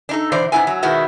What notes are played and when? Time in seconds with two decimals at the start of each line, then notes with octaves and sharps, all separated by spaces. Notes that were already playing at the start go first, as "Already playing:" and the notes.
0.09 D4 D#4 A4
0.32 B2 E3 D4 C5 D5
0.52 G#2 B3 D4 E4 A#4 G#5
0.67 F#3
0.83 B2 D#3 G#3 B3 E4 F#4